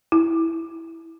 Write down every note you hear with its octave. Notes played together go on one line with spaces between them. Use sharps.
E4